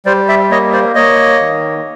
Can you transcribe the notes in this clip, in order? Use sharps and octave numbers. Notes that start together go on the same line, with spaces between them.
G3 C5 D5
D5 E5
A#3 C#5 D#5
C5 D5
A#3 C#5 D#5
D#3